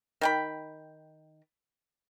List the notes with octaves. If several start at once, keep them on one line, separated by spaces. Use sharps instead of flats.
D#3 G5 B5